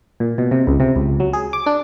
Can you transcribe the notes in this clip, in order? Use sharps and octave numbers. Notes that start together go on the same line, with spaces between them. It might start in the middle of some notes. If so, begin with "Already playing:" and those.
A#2
B2
C3
C#2
C3
C#2
F#3
G#4
D6
D4